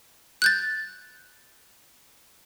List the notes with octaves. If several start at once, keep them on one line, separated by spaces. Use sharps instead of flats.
F#6 G6 A6